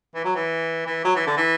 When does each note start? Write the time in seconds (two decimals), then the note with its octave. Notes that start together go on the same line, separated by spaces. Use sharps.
0.15 E3
0.25 F#3
0.35 E3
0.86 E3
1.04 F#3
1.16 E3
1.27 D3
1.37 E3